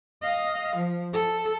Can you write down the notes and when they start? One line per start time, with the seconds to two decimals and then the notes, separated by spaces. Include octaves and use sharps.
0.22 D#5 F5
0.76 F3
1.13 A4